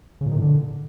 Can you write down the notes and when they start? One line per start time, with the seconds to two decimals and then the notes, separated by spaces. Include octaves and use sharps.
0.21 C#3
0.26 A#2
0.31 D#3
0.37 A2
0.42 D3